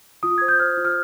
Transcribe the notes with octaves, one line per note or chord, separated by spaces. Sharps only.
F4 D#6
C5 G#6
G6
C5 F6
F4
F6